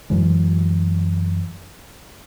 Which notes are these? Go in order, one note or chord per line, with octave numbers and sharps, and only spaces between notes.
F#2 E3 F#3 G#3